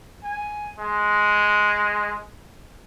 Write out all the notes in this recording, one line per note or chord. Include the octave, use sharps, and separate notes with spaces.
G#5
G#3